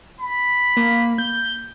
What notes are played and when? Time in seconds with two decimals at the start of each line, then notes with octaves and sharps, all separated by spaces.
0.20 B5
0.77 A#3
1.18 G6